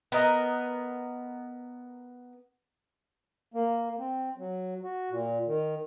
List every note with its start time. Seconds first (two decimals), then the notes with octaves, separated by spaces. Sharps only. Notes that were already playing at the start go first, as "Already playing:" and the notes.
0.12 B3 A#4 D#5
3.54 A#3
3.99 C4
4.38 F#3
4.83 F#4
5.10 A#2
5.47 D#3